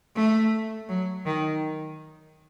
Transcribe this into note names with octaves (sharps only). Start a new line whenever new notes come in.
A3
F#3
D#3